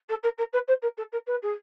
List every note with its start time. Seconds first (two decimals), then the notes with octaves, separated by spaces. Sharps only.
0.09 A4
0.23 A#4
0.38 A#4
0.53 B4
0.68 C5
0.82 A#4
0.97 A4
1.12 A#4
1.26 B4
1.42 G#4